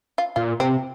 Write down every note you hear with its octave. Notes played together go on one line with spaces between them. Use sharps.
F4
A#2 F4
C3 C4